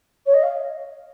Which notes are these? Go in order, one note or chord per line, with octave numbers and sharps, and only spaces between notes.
C#5
D#5
F5